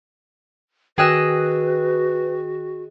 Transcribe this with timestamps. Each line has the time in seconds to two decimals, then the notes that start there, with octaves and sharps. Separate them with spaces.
0.98 D#3 F#4 G#4 B4 D#5 G5 E6 F#6